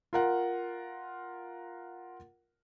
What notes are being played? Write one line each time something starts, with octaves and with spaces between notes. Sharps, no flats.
F4 A#4 F#5